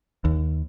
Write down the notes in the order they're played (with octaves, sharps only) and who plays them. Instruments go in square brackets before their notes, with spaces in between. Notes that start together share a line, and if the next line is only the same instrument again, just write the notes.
[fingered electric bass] D#2